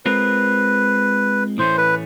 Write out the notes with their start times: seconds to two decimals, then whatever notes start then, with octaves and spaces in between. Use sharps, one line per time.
0.05 G#3 C4 F4 A#4 B4
1.58 A2 E3 A3 C#4 C5
1.78 B4